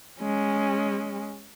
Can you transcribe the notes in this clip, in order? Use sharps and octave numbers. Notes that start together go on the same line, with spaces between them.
G#3 C#4